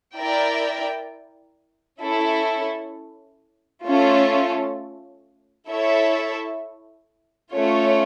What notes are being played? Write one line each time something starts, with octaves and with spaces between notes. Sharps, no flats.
E4 A#4 D5 G5
C#4 E4 A4
A3 C#4 F4 A4
E4 A4 C#5 E5
A3 C#4 F4 C#5